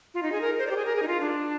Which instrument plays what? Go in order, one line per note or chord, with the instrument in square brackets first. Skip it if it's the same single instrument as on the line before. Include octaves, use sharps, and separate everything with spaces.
[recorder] F4
D#4
G#4
A#4
C5
D5
G4
G#4
A#4
G#4
D#4
F4
D4